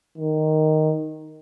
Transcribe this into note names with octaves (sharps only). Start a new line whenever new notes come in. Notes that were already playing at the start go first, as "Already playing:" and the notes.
D#3